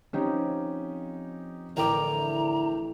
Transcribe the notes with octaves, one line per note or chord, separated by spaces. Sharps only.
F3 C4 C#4 D#4 G4
A1 D3 E4 A#4 G5 A#5 D6